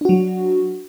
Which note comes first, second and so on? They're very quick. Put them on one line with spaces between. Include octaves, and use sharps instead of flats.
D4 F#4 F#3